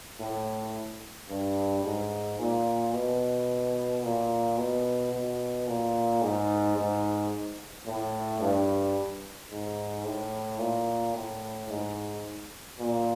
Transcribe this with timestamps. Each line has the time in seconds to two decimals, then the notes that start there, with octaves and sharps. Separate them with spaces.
0.19 A2
1.29 G2
1.84 G#2
2.38 A#2
2.93 B2
4.03 A#2
4.57 B2
5.12 B2
5.67 A#2
6.22 G#2
6.77 G#2
7.86 A2
8.41 G2
9.51 G#2
10.05 A2
10.60 A#2
11.14 A2
11.70 G#2
12.79 A#2